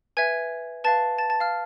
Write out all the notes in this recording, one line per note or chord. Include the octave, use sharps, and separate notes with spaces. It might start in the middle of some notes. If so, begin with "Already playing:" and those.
B4 E5 G#5 G#6
B4 F5 A5 A6
A5 A6
A5 A6
F5 F6